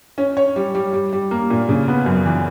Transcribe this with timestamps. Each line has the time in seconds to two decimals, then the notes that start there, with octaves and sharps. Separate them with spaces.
0.18 C#4
0.37 C#5
0.56 G3
0.75 G3
0.93 G3
1.13 G3
1.31 A#3
1.50 A#2
1.69 C#3
1.88 B3
2.06 F#2
2.26 E3